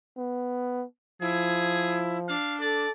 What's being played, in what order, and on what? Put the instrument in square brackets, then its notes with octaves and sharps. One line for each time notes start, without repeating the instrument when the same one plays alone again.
[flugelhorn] B3
[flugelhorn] F3 [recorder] E4 [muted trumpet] G#4
[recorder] D4 [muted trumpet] F5
[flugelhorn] A4 [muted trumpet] D5